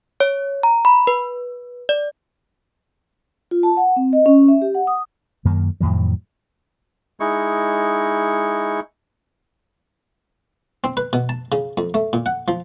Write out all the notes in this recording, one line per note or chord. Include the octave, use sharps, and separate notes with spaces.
C#5
A#5
B5
B4
D5
F4
A5
F#5
C4
D#5
C#4
E5
G4
F#5
D#6
F#2 D#3 A#3
F2 A2 D#3 F#3
G#3 D#4 E4 C#6
C4
B4
B2
A5
C#3
F2
A3
A#2
F#5
F3